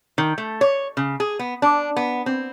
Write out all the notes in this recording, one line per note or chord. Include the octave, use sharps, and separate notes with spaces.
D#3
A3
C#5
C#3
G#4
B3
D4
B3
C4